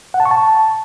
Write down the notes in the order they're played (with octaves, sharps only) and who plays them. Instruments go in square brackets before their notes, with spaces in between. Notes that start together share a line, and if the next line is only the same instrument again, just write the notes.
[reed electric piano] F#5
A5
C#6
A5